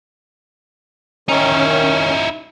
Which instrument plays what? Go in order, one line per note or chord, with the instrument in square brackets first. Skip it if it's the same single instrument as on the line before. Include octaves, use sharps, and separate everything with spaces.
[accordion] D#3 C#4 [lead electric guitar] D#4 E4